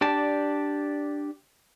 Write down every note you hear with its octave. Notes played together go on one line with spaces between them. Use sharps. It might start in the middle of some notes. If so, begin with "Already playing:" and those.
D4 G4 D5 A5